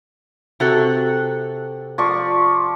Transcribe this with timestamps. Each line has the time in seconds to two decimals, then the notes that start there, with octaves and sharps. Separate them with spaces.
0.60 C3 F#4 A4
1.98 F3 D5 C#6